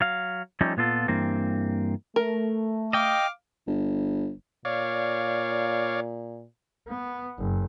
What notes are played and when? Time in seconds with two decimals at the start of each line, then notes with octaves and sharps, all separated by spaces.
0.01 F#3 F5
0.61 F3 G3 A3 C#4 D#4 G4
0.77 A#2 B3 F4 A4
1.08 G2 E3 A#3 C4
2.16 A3 A#4
2.93 D#5 F5 G5 D6 F6
3.67 G1
4.65 A#2 C#5 D5 F5
6.88 B3
7.38 F#1